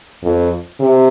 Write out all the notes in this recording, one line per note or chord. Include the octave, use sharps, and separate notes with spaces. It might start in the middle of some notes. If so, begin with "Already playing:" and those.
F2
C3